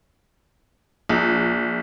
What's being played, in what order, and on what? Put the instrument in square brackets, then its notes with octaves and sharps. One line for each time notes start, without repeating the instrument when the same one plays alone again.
[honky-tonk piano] A#1